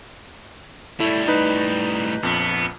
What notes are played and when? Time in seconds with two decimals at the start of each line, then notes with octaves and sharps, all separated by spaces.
1.00 A2 G3 A3 E4 E5
1.28 D#4 B4
2.23 A#1 F2 B3